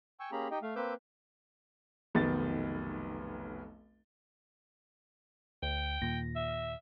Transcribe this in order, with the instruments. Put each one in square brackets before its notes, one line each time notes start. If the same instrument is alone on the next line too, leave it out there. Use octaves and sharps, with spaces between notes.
[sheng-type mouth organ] G5 G#5 C#6 E6
A#3 C#4 G4 G#4 A#5 B5
D#4 G4 D#5 G5
A3 F5
A#3 C4 B4 D6 E6 G6
[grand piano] F1 B1 D#3 B3 A6
[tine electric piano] D2 [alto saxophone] G5
[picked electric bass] D#2 A#2 [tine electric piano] A#6
[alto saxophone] E5